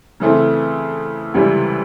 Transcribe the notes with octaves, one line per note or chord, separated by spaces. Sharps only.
C#3 E3 A3 C4
C#2 C3 E3 G3